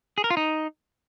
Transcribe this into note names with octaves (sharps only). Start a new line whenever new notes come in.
G#4
A#4
F4
D#4